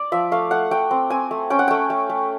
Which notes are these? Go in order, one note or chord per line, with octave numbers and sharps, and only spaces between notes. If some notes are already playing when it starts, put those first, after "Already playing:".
Already playing: D5
F3 E5
A3 F5
A3 F#5
A3 G5
C4
C4 G#5
A3
C#4 G5
F#5
A3 G5
A3
A3